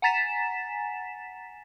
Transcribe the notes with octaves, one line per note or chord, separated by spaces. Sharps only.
F#5 G#5 A#5 A6 B6 E7